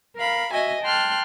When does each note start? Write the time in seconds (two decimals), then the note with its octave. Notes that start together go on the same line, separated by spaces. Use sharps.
0.17 A#4 F5 B5
0.53 F#4 D#5 E5 G#5
0.83 G5 A5 C6 F6 F#6